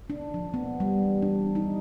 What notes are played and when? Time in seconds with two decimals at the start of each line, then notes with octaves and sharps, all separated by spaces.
0.10 D4
0.34 F3
0.54 B3
0.80 G3
1.05 E3
1.22 D4
1.55 D#4